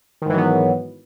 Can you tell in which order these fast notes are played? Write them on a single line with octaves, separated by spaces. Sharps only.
D#3 G#2 E3 F#3 B3